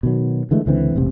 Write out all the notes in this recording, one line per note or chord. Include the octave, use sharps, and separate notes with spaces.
B2 D#3 F#3
D3 E3 G#3 A3
C#2 D3 E3 C4
E1 A1 C3